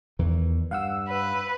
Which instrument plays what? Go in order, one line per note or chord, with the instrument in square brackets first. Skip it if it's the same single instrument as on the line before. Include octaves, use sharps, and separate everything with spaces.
[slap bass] E2 D#3 E3
[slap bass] G2 [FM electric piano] F5 F#5 E6
[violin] B4